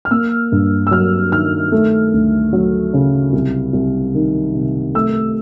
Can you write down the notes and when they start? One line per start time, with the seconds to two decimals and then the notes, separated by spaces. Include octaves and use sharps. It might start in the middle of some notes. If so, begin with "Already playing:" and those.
0.05 F6
0.11 A#3 E6
0.52 G2
0.87 E6
0.91 F#3 F6
1.31 D#3 F6
1.72 A3
2.13 D2
2.53 F#3
2.93 C#3
3.33 C2
3.73 C2
4.14 D#3
4.54 C3
4.94 A3 E6